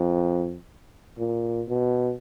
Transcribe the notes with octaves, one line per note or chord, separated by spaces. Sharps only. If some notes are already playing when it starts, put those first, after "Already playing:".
Already playing: F2
A#2
B2